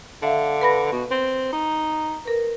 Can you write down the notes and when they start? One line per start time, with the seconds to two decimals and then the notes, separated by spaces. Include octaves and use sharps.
0.23 D3 E5 F5
0.61 B4 B5 A#6
0.93 B2
1.11 C4
1.53 D#4
2.25 A#4 B4